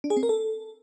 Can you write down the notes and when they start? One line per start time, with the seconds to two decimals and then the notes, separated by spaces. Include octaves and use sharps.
0.04 D4
0.10 G#4
0.17 C4
0.23 A#4
0.29 A4